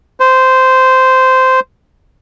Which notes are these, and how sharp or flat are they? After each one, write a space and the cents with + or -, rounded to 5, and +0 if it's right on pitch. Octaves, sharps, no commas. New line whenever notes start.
C5 -10